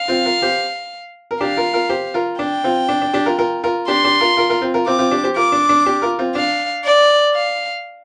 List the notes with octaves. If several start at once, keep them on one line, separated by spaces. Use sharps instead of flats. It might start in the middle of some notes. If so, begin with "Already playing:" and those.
Already playing: F5
C4 F4
F4 A#4
G4 C5
A#4
D4 G4 F5
F4 A#4
F4 A#4
G4 C5
F4 A#4
D4 G5
C4 F4
D4
D4
D4 G4
F4 A#4
F4 A#4
F4 A#4
D4 G4 C6
D4 G4
F4 A#4
F4 A#4
F4 A#4
C4 F4
F4 A#4
C4 F4 D6
C4 F4
D4 G4
G4 C5
F4 A#4 D6
D4
D4
D4 G4
F4 A#4
C4 F4
D4 F5
D5
F5